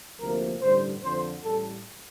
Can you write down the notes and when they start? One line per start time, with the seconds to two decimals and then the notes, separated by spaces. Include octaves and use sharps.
0.20 D2 C3 F3 A#3 A#4
0.60 A1 G2 D3 G3 C5
1.02 F2 D3 F3 C5
1.43 A1 A2 G3 A4